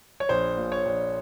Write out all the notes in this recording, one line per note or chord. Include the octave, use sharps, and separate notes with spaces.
C#5
A#1 C5
A#2
C#5
A#1